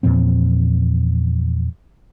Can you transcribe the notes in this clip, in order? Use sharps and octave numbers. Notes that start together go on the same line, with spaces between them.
E2 A#2 F3 C4